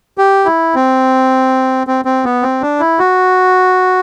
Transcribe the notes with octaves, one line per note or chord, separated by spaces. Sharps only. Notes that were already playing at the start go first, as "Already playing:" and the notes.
G4
E4
C4
C4
C4
B3
C4
D4
E4
F#4